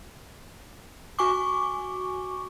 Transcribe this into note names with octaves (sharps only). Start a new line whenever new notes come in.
F#4 G#5 C#6 D6